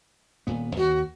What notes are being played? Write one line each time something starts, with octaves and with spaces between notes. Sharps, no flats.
D#1 A#2 B3
D#2 F#4